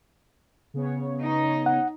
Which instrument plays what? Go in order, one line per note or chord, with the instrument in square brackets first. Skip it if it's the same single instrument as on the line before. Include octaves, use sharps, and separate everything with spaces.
[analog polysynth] C#3 B3 C#5
[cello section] D#4
[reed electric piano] F#5